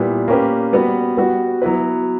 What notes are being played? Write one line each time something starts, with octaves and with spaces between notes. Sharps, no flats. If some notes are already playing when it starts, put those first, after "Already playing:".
Already playing: A#2 G3 B3 E4 G4
A#3 C#4 G4 B4
G3 B3 F#4 B4
G3 B3 F#4 B4
F#3 B3 E4 B4